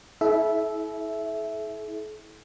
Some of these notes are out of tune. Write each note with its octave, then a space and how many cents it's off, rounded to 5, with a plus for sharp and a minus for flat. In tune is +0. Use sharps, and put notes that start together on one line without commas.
E4 -30 A4 -45 E5 +0